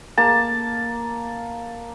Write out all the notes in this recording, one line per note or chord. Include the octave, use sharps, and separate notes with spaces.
A#3 A5